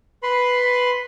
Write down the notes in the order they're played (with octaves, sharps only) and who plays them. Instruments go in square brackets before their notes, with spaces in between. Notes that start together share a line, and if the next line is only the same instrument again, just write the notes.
[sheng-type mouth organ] B4 B5 C6